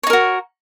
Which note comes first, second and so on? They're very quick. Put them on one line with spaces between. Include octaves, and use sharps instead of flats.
C#5 D#4 A#4 F#4